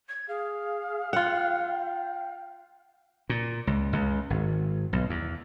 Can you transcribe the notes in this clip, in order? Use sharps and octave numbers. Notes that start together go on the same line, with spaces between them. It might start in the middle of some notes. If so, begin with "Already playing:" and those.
G#6
G#4 F5
F4 F#5 G5
A#2
C#2
C#2
G#1
B1
E2